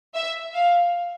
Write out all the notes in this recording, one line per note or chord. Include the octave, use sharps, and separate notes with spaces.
E5
F5